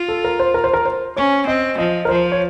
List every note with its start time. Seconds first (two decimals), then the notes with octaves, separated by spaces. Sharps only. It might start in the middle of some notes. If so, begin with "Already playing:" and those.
Already playing: F4
0.08 A4
0.24 A#4
0.40 C5
0.54 A#4
0.64 C5
0.74 A#4
0.86 C5
1.16 C#4 C#5
1.47 C4 D#5
1.78 F3 D#5
2.05 A#4
2.09 F3 C5
2.32 C#5